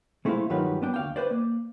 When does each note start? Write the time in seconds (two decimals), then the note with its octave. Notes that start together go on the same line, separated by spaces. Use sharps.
0.25 G#3 A3 B3 E4 C5 F5
0.50 G2 D#3 F#3 G3 F4 B4
0.82 B3 D4 G5
0.94 D2 F5 G5
1.16 B4 C5 D5
1.31 A#3